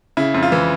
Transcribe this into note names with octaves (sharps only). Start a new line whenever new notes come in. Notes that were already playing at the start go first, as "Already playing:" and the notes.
C#3 E4
F2
F4
E3